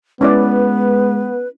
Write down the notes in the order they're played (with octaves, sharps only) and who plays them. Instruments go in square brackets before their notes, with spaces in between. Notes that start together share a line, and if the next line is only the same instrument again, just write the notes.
[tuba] G#3 [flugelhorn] B3 [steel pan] C#4 E4 D5 [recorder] B4